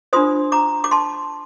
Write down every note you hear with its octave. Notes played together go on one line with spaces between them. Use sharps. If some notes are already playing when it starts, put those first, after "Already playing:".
D4 F4 C5 C6 D#6
A#5 D6
D6
A5 C6